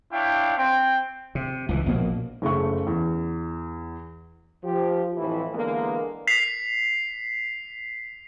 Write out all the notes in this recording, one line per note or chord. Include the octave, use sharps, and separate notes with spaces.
D4 E4 C#5 F5 G5
C4 G5
C3
C#2 D3 E3
A#1 B2 A#3
F#1 C#3 A3 C#6
E2
F3 G4
F2 A2 E3 E4
D3 E3 G#3 A#3 B3 A#4
B6 C7 F7